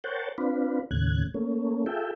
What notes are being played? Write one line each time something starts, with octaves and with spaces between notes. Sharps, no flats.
A#4 C5 C#5 F#5 G5 A5
C4 D4 F4 B4
D#2 A2 C#3 F#6 G#6
A3 A#3 C#4
F4 G#4 A4 E5 G5